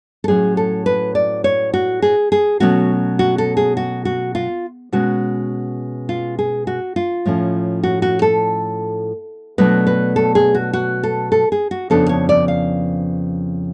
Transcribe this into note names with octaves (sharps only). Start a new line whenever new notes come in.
A4
A2 F#3 C#4 G#4
A4
B4
D5
C#5
F#4
G#4
G#4
B2 F#3 A3 C#4 F#4
F#4
A4
G#4
F#4
F#4
F4
B2 G#3 C#4 F#4
F4
G#4
F#4
F4
A2 F3 A3 C#4
F#4
F#4
A4
B2 F#3 A3 D4 B4
B4
A4
G#4
F#4
F#4
A4
A4
G#4
F#4
F2 C#3 F3 B3 D4 A4
C#5
D5
F5